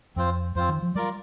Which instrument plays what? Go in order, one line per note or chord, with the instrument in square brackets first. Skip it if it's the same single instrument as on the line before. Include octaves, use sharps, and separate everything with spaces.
[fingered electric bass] F2 [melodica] C4 F4 C5
[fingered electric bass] F2 [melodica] C4 F4 C5
[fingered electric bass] D#3
F3
[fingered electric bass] G3 [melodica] F4 A#4 D5